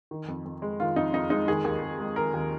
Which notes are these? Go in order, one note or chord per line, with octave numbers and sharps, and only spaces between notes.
D#3
F2
F2
G#3
D#3 F4
F2 D#4
F2 D#4
G#3 D#4
D#3 G#4
D#2
D#2
G#3
D#3 A#4
D#2